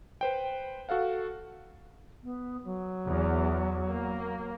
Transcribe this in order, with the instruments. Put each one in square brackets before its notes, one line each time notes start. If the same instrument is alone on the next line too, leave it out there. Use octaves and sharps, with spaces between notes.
[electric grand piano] B4 C5 G5
F#4 A4 F5 F#5
[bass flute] B3
F#3
[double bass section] E2
A#3